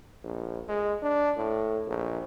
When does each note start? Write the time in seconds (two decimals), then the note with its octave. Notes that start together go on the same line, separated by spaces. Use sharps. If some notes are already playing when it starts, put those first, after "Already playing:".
0.24 A#1
0.68 G#3
1.02 D4
1.37 A2
1.87 A#1